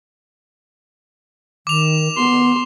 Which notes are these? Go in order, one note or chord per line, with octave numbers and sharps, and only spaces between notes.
D#3 D6 F7
B3 C6